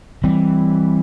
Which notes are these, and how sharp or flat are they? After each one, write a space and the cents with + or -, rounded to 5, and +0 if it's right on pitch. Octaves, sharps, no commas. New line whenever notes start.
E3 +0 G3 +0 C4 +0